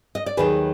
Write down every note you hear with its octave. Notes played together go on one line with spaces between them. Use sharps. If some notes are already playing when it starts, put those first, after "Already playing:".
D#5
D5
D#2 D#3 F#3 G#4 B4